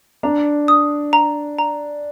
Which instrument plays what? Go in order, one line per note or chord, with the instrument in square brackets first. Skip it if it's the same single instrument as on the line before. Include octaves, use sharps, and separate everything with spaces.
[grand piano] D4 [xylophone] A#5
[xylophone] D#6
A#5
A#5